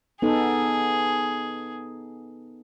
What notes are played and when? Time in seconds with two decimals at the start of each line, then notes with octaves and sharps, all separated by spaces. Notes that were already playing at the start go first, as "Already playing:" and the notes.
0.22 B3 D#4 G#4 A4